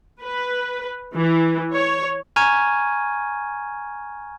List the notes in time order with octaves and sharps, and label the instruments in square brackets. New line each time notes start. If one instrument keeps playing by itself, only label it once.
[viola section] B4
E3
C#5
[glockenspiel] G#5 A#5 C#6 F6 G#6 D#7